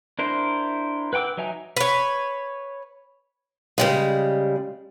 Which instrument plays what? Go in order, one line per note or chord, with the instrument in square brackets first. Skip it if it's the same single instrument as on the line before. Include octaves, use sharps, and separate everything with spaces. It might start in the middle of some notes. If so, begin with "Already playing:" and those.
[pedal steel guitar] D4 E4 A#4 C5
B4 F#5 G5 D6 E6
F#3 D#4 E5 G#5 A#5
[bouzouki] B4 C#5
[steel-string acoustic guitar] C#3 G3 G#3